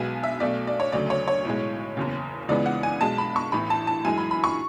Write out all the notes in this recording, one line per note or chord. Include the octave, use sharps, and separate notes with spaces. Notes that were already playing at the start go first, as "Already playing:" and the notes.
Already playing: B1 B2 G#3 B3 G#5
E5
B1 B2 A3 D5
D5
C#5
D2 C#3 F#3 A3 D5
C#5
C#5
B1 A2 G#3
F#1 E2 C#3
C#2 C#3 E3 G#3 B3 D5
F#5
G#5
B1 B2 G#3 A5
B5
C#6
A1 A2 E3 B5
A5
A5
F#2 E3 G#3 G#5
B5
B5
C#6